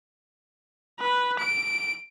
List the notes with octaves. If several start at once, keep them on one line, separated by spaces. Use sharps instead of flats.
B4
D7